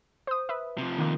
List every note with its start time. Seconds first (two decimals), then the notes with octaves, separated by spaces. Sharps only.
0.27 C5 D#6
0.49 B4 E5
0.78 C3 F3
0.98 D#3 A#3